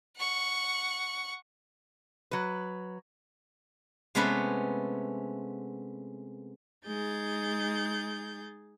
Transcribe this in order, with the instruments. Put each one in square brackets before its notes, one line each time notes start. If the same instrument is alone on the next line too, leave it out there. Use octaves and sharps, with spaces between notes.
[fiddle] F#5 C#6
[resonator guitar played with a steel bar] F#3 B4
[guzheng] C3 G#3 A3 B3 C#4 B4
[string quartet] G#3 D#4 G#4 G6 A6